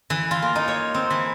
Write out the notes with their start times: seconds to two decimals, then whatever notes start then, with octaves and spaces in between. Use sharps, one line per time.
0.10 E3
0.31 F4
0.42 A#3
0.56 D#4
0.68 C#5
0.94 C4
1.10 E3